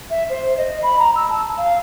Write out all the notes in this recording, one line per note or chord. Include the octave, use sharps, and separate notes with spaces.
E5
C5
D#5
B5
A#5
E6
A5
F5